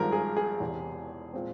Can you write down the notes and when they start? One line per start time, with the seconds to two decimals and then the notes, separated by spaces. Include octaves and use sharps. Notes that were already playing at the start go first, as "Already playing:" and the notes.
Already playing: G#1 G2 F3 G#3 A#4
0.12 G#4
0.37 G#4
0.60 E1 E2 C3
1.34 A#2 G#3 C4